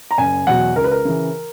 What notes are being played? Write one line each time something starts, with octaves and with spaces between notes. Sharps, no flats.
A#5
F#1 G#5
E2 B2 F#3 F#5
C#2 A#4
B4
A#4
C#3 E3